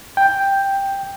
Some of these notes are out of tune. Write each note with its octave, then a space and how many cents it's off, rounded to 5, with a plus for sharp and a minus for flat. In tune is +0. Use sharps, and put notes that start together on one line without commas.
G5 +5